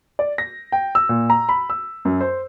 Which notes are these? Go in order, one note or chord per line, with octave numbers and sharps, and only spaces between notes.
D5
A#6
G5
E6
A#2
A#5
B5
E6
F#2
C5